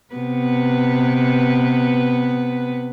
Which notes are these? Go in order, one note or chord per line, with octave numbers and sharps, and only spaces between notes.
C3 B3 B4